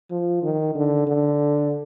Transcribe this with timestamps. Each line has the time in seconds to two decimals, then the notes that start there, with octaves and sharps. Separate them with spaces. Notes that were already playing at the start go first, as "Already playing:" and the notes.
0.11 F3
0.43 D#3
0.75 D3
1.07 D3